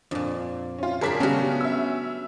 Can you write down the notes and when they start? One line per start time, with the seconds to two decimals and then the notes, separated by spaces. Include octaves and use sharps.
0.11 F2 A#2 D4
0.78 C#4 F4
1.01 F#3 D4 G4 G#4 A#4 B6
1.20 C#3 G3 A3 B3 C#4 F#4
1.61 E5 E6